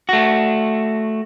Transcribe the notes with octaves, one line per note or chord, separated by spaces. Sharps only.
A3 F#4